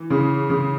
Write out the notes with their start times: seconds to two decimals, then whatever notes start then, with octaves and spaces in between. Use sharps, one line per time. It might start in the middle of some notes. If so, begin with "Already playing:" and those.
Already playing: E3
0.10 C#3
0.50 C#3